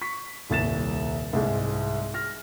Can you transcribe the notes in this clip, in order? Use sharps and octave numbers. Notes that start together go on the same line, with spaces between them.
C#6 B6
D#1 C2 A6 E7
C2 G#2 G#3
F6 A#6